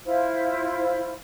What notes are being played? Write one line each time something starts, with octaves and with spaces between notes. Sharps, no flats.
E4 F4 C5